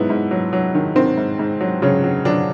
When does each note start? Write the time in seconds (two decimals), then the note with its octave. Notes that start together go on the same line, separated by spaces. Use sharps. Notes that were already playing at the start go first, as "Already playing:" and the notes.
Already playing: G#2 F#3 B3 E4
0.10 G#2
0.31 F#3
0.53 F#3
0.75 D#3
0.96 D#3 C4
1.17 G#2
1.39 G#2
1.61 F#3
1.82 C#3 F#3 C#4
2.04 F#3
2.25 D3 F#3 D4